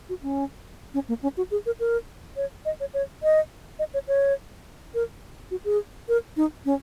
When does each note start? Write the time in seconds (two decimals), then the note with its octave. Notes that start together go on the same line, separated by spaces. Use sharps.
0.09 F#4
0.22 C#4
0.94 C#4
1.09 A#3
1.23 C#4
1.37 F#4
1.51 G#4
1.66 A#4
1.80 A#4
2.37 C#5
2.65 D#5
2.80 C#5
2.94 C#5
3.23 D#5
3.79 D#5
3.94 C#5
4.08 C#5
4.94 A#4
5.51 F#4
5.65 G#4
6.09 A#4
6.37 D#4
6.65 C#4